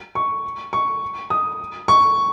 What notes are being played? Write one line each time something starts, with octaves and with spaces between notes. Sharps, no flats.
C#6
C#6
D#6
C#6